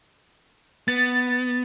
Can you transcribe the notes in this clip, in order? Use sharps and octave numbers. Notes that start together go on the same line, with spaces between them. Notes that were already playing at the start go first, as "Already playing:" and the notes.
B3 A6